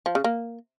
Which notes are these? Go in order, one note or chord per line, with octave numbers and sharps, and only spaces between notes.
F3
C#3
A#3